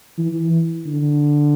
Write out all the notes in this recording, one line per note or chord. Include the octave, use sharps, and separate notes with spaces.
E3
D3